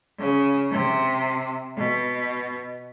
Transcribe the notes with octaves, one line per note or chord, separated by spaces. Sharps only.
C#3
C3
B2